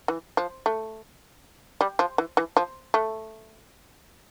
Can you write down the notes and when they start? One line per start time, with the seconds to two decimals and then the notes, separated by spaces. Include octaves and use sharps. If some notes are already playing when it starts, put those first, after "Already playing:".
0.08 E3
0.37 F3
0.66 A3
1.81 G3
1.99 F3
2.18 E3
2.37 E3
2.57 F3
2.94 A3